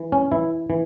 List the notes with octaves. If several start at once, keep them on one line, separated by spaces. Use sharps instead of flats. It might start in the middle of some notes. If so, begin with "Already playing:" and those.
Already playing: E3
C#4
E3 E4
E3